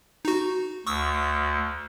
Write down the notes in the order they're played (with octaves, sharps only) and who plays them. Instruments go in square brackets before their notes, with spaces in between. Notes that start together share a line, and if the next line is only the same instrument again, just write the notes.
[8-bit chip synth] D#4 F#4
[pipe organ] D2 [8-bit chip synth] C#6 D#6 E6